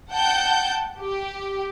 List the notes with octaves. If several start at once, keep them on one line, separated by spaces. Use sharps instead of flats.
F#5 G5 A5 G6
G4